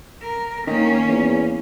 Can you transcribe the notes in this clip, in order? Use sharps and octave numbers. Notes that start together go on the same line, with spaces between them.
A#4
D#3 A#3 C#4
E2